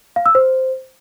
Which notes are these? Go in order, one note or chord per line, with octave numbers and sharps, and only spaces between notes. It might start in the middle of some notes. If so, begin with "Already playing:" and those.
F5
E6
C5